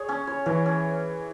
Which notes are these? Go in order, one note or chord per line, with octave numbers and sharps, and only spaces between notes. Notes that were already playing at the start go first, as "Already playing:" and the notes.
Already playing: G#4 C#5
C#4
C#5
E3 C#4
C#4